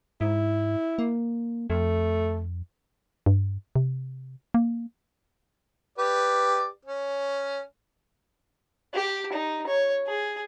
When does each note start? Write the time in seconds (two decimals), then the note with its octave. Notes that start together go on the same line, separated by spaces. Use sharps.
0.21 G#2 E4
0.99 A#3
1.70 F2 A3
3.26 G2
3.76 C3
4.54 A#3
5.98 G4 B4 D5
6.85 C#4
8.94 G4
9.33 D#4
9.67 C#5
10.07 G#4